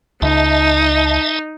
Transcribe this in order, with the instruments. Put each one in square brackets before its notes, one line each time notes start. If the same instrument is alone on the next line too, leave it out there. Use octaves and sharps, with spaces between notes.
[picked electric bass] C#2 [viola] D#4 [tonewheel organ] D#5 E5 A5